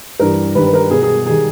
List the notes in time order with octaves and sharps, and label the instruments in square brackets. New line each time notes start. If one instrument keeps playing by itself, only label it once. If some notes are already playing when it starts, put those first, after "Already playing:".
[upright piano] G2 E3 G3 A#4
G2 D#3 G3 B4
B4
A#4
B2 G3 G#4
G#4
D#3 G3 G#4